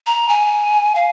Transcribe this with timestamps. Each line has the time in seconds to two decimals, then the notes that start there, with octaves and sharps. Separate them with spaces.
0.06 A#5
0.29 G#5
0.95 F5